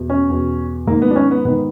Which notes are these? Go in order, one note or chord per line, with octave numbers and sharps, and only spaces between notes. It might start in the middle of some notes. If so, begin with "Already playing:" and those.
Already playing: E2 B2
C#4
E2 B2
G#2 D#3 A#3
B3
D4
C#4
B3
G#2 D#3 B3